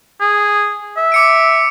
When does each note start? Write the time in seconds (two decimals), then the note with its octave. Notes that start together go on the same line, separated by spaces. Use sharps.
0.21 G#4
0.97 E5
1.12 D6 C#7 D7